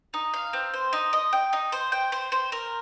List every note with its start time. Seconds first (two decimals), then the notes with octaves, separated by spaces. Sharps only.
0.14 D#4
0.34 F5
0.53 C4
0.74 C5
0.93 D#4
1.13 D#5
1.33 G5
1.53 D#4
1.72 C5
1.92 G5
2.12 C5
2.32 C5
2.52 A#4